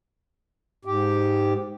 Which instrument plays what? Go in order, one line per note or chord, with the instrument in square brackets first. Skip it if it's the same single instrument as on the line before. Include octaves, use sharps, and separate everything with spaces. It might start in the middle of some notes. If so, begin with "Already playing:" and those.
[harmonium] G#2 G4